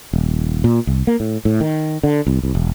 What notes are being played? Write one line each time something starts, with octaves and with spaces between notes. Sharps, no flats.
D#1
A#2
C2
A#3
A2
A2
D#3
D3
C2
C2
E1